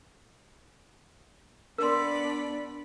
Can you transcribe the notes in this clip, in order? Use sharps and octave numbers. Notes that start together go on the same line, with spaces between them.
B3 D4 A#4 D5 B5 C6